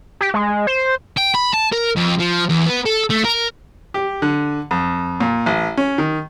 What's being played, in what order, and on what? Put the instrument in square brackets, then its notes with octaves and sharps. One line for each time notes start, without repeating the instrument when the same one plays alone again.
[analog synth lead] G4
G#3
C5
[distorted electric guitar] G5
B5
A5
A#4
F2
F3
E2
B3
A4
A3
A#4
[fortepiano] G4
D3
F2
A#2
A1
C#4
D#3